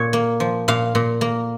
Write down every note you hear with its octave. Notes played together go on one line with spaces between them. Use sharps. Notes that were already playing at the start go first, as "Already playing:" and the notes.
Already playing: A#2 C#5
A#3
F3
A#2 F5
A#2
A#3